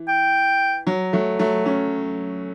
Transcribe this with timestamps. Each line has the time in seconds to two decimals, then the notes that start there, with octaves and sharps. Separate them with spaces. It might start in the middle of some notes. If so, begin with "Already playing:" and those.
Already playing: E3
0.08 G5
0.87 F#3
1.13 F#3 A3
1.39 F#3 A3
1.65 A3 C#4